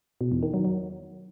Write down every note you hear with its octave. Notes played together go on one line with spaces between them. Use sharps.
B2
E2
D#3
F#3
F#3